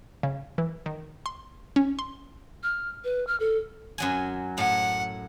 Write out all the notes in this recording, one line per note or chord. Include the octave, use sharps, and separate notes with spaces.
C#3
E3
D#3
C6
C#4
C6
F6
B4
F6
A4
F#2 F#3 G#5
A2 F#5